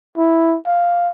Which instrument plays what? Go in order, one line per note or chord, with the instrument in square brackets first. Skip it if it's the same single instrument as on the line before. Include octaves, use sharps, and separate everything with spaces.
[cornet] E4
F5